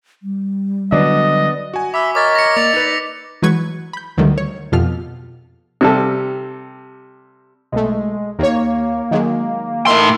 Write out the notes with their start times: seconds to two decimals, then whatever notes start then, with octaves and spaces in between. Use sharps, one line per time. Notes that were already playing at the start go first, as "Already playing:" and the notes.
0.23 G3
0.92 D3 F#3 B3 D4 D#5
1.74 F#4 G#5
1.94 E5 B5 D6 E6
2.15 A#4 C#5 D#5 D6 A6 B6
2.35 A#6 C#7
2.56 A#3 D5 F7
2.73 D#4 B4
3.42 E3 F#3 G#3 B4 C#6 G#6
3.93 B5 G6
4.17 D2 D3 D#3 F#3 G3 A3
4.38 C#5
4.72 F2 B2 F4 G4 A4 F6
5.81 C3 G3 A4
7.72 B1 G#3 A3
8.39 D#2 A#3 C#5
9.11 D#3 F#3 G#3
9.87 A2 D#4 A#4 E5 C6